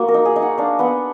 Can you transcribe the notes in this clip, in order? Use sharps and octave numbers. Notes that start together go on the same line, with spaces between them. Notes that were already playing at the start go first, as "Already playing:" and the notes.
Already playing: A#3 F#4
A#4
D#4
G#4
D#4
F#5
D4 F5
B3 F#5